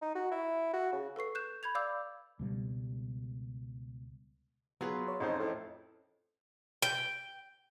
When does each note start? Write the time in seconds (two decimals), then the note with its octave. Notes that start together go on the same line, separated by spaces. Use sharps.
0.02 D#4
0.15 F#4
0.31 E4
0.73 F#4
0.92 C#3
1.16 A4 B4 C#6 C7
1.35 F#6 G6 E7
1.63 B5 G6 G#6 F7
1.75 D5 F5 D6 E6 G6
2.39 C#2 B2 G3
4.81 F#3 B3 F4 G#4 B4
5.08 C#5
5.20 A1 F2 D#4 C5
5.40 A2
6.82 G5